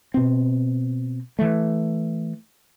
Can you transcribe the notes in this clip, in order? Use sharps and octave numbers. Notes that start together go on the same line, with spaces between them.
B2 C4
E3 A3